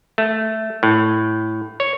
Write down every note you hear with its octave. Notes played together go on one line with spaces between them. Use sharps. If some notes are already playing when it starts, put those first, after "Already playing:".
A3
A2
C#5